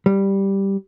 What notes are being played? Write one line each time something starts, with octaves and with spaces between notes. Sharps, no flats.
G3